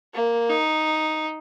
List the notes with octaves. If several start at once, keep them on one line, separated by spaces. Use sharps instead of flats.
A#3
D#4